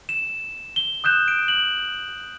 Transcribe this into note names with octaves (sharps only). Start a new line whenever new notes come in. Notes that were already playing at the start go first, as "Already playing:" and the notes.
E7
G7
D#6 F#6 G6 E7
D7
F#7